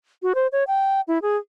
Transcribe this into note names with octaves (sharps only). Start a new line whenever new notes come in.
F#4
C5
C#5
G5
E4
G#4